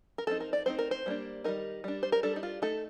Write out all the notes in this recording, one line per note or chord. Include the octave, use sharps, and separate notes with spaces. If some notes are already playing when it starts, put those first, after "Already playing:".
A#4
F3 C4 D#4 A4
A#4
D5
A3 C4 D#4 C5
A#4
C5
G3 A#3 D4
D#3 G3 C4 D#4 A#4
G3 D4
C5
A#4
G3 D4 A4
D#4
F4
A3 D#4 A4